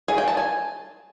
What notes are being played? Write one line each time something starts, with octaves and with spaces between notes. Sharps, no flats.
G#4
G5
A5
G#5